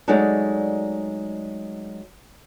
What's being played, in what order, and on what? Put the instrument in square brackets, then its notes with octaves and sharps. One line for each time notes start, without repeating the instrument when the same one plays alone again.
[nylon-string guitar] F#3 G#3 A3 D#4 D5 F#5